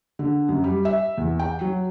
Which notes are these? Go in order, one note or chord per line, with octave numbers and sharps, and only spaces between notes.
D3
F#2
G3
E5
E2
G5
F#3